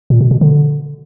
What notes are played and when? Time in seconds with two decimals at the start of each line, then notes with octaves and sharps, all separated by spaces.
0.10 A#2
0.21 B2
0.31 B2
0.41 D3